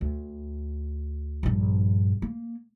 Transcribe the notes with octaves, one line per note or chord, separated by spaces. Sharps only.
D2
A#1 G2
A#3